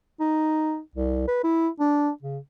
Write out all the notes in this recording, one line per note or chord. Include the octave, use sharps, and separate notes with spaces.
D#4
C2
B4
E4
D4
C#3